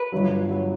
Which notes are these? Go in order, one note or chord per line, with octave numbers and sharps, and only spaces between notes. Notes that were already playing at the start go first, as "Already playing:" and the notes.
Already playing: B4
G1 G2 F#3
F#3